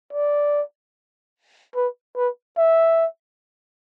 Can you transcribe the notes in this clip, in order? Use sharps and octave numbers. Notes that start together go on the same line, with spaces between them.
D5
B4
B4
E5